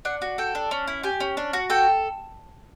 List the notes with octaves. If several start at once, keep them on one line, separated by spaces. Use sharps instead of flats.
D4 F#5
F#4
A4 G5
D4
C#4
E4
G4 G#5
C#4
D4
F#4
A4 G5